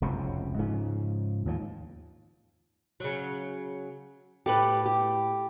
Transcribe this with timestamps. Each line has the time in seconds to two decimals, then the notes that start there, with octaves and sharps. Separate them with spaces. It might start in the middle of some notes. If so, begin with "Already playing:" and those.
0.02 F1 C#2 F#2 C3
0.59 G#2 C#3 F3
1.46 D#2 A2 F3
3.00 C#3 F#3
4.46 A2 G4 A4 B4
4.86 G4